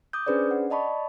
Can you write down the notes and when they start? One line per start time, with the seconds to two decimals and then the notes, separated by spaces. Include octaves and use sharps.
0.13 D6 D#6 G6
0.27 C#4 D4 G#4 B4 C5 D5
0.51 F#5
0.70 D5 D#5 A5 B5 C#6